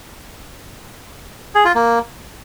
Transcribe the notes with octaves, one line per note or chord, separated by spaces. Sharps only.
G#4
F4
A#3